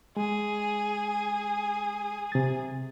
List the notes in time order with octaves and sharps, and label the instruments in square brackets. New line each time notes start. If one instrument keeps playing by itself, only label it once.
[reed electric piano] G#3 [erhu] G#4
[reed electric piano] C3 A6